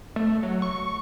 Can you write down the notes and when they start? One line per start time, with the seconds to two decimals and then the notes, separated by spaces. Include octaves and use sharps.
0.16 A3
0.43 F#3
0.62 C#6